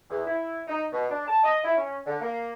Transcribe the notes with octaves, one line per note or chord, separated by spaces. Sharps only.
E2
E4
D#4
B2
D4
A5
D#5
E4
C#4
D3
A#3